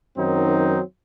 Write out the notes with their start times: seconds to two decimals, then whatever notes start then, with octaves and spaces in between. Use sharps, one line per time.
0.17 F#2 D#3 F#3 C4 D#4